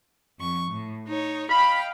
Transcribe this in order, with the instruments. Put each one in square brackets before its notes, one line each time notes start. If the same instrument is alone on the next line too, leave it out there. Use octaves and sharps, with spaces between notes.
[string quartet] F2 C#6
A2
D#4 C#5
[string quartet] D#5 F5 G5 [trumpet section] B5